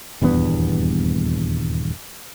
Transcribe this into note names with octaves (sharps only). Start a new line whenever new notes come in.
D#1 E2 G2 B3